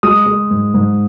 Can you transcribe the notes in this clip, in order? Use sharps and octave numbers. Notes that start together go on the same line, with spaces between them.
G#3 D#6
G#3
G#2
G#2